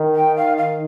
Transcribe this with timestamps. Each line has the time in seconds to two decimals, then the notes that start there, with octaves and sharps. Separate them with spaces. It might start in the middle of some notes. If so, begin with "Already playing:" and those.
Already playing: D#3
0.15 G5
0.36 F5
0.57 F5